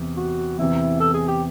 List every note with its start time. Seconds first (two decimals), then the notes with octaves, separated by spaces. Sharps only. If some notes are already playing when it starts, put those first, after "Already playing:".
Already playing: E2 C3 E3
0.17 F#4
0.58 E2 C3 E3 E4
1.00 A4
1.14 G#4
1.28 G4